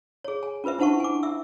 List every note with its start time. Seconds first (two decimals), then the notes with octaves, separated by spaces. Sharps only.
0.24 G#4 C#5
0.43 G#5
0.64 C#4 F4 B4 C5 E5
0.79 D4 E4 C5 F#5 A5 C#6
1.00 G#5 D6
1.23 E5 E6